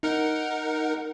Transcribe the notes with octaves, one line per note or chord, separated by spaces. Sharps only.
D#4 A#4 F#5